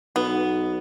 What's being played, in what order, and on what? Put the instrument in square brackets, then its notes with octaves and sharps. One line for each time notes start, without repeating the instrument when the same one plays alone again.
[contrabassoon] B1 [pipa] B3